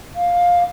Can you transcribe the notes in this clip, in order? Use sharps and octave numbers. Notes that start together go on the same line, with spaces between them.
F5